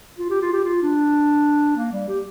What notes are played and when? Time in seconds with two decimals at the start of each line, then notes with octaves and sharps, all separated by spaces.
0.18 F4
0.30 G4
0.42 F4
0.53 G4
0.64 F4
0.82 D4
1.76 A#3
1.92 G3
2.09 G4